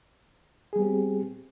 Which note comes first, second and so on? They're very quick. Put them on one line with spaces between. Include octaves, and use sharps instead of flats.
G#4 G3 B3 G4 C4